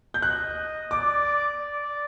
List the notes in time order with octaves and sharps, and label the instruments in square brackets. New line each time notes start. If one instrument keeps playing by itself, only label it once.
[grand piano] G6
[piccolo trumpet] D#5 [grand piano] F#6
[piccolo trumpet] D5 [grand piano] D6
[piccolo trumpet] D5